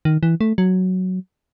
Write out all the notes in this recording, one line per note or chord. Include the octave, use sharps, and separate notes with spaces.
D#3
E3
A3
F#3